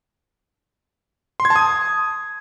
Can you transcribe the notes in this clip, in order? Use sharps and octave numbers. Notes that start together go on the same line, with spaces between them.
C6
G#6
A5
D#6